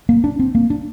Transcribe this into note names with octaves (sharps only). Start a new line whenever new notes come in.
A#3
D4
C4
A#3
D4